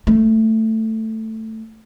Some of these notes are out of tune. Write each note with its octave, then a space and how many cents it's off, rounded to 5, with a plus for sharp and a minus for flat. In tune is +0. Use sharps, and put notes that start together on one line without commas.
A3 +10